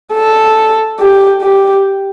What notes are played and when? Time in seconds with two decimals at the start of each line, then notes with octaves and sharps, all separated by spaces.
0.14 A4
0.99 G4
1.42 G4